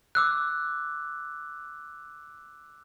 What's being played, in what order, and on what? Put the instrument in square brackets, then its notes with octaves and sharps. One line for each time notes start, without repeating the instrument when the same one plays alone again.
[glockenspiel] D6 E6 F#6